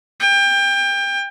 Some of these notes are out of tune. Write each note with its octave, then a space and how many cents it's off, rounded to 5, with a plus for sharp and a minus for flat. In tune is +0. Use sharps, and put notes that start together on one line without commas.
G5 +25